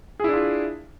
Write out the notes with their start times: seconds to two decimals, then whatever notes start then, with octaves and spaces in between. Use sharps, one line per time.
0.20 G#4
0.24 E4
0.29 D4
0.33 F4